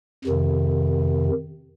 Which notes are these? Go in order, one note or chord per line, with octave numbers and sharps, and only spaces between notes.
F2 C3 D#3